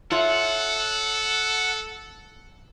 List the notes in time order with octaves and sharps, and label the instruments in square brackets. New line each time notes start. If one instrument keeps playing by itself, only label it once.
[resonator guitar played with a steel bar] F4 C#5 E5 [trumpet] A4 [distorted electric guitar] F#5